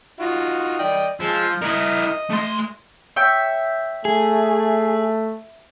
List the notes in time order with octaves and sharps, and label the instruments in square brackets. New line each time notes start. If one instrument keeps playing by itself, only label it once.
[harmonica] D#4 F4 F#4
D5 D#5 G5
[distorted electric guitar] F3 [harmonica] G#3 E6
[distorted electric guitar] E4 A#4 [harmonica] D#5
[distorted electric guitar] A3 C6
[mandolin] C#5 E5 G5
[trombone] A3 [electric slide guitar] G#4